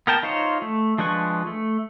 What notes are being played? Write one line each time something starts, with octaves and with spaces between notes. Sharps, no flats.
B3 A#4 G5 A5
D#4 F4 C5 C#5
A3
F3 G#3 D4 B4 C#6
A3